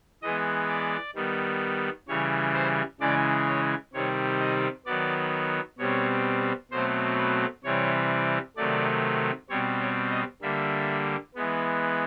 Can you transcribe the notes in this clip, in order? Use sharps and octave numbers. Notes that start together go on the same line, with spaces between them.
E3 G#3 B3 D#5
D5
D#3 G3 B3
C#3 E3 G3 C#5
C5
C#3 E3 G#3 D5
C#5
C3 D#3 G3 C4 C#5
D#5
D#3 F#3 B3 D5
B2 G3 C4 C#5
B2 F#3 A3 C4 C5
B4
C3 E3 G3 C4 C#5
C3 D#3 F#3 A3 D5
B2 G3 C4 C#5
C#5
D#5
D3 G3 A#3 E5
E3 G#3 B3